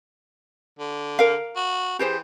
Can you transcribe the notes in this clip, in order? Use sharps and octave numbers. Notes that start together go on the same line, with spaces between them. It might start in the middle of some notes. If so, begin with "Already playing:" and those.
D3
A#4 F5
F#4
E3 G4 G#4 C5